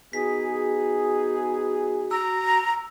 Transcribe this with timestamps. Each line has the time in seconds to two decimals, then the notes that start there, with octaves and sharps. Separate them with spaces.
0.13 B3 D#4 F#4 G#4 B6
2.11 A#5 E6